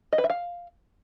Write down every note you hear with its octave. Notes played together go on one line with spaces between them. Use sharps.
D#5
B4
E5
F5